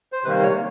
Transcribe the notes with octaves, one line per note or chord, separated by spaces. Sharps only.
C5
C3 D#3 G3 A#3 B4
C#5